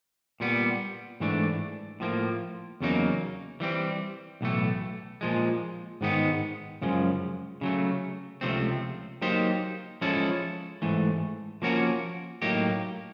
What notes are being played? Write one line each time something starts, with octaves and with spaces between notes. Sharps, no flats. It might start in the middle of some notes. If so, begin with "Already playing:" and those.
A#2 G3 B3
G#2 E3 A3 D4
A2 F3 A#3
E2 C#3 F#3 A#3 D#4
E3 G3 C4
B1 A2 E3 A3
A#2 F3 G#3
G#2 D#3 G#3 B3 D#4
F#2 C#3 F3 G#3
C#3 F#3 A3
C#2 C3 F3 A3 C4
F#3 A#3 D#4 G4 C5
F3 G#3 C#4 E4 A4
G#2 E3 A3
F3 A#3 C#4 F#4 A#4
A2 F#3 A#3 D#4 G4